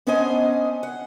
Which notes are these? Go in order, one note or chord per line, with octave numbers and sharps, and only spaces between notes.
B3 C#4 D4 C5 D#5 G#5
F#5